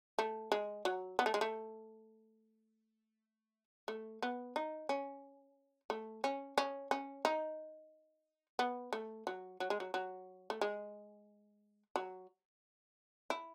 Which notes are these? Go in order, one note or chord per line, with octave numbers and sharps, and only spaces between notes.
A3
G#3
F#3
B3
A3
G#3
A3
A3
B3
D#4
C#4
A3
C#4
C#4
C#4
D#4
B3
A3
F#3
F#3
G#3
F#3
F#3
A3
G#3
F#3
E4